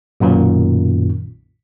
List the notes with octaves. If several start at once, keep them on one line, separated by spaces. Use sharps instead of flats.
B1 F#2 A#2 D#3